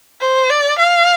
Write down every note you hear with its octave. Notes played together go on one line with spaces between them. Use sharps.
C5
D5
F5